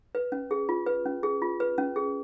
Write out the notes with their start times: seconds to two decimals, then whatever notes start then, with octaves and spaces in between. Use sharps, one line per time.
0.15 B4
0.32 C#4
0.51 G#4
0.69 F4
0.87 B4
1.06 C#4
1.23 G#4
1.42 F4
1.60 B4
1.78 C#4
1.96 G#4